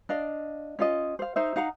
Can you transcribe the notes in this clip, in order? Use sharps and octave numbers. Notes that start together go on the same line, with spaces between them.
D4 D#5 F5
C#4 F4 D#5
C5 F5
D#4 C5 E5
D#4 F5 F#5 A#5